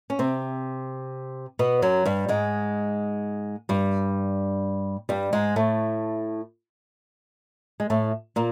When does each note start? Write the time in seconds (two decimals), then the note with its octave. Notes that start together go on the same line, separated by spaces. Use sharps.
0.10 C#4
0.19 C3 C4
1.59 B2 B3
1.82 F#2 F#3
2.05 G2 G3
2.28 G#2 G#3
3.69 G2 G3
5.09 G2 G3
5.33 G#2 G#3
5.56 A2 A3
7.80 G#3
7.90 A2 A3
8.36 A#2 A#3